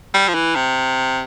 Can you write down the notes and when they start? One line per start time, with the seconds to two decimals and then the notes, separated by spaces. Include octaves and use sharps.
0.14 G3
0.28 F3
0.34 E3
0.56 C3